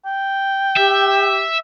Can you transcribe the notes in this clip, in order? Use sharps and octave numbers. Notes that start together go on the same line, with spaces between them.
G5
G4 E5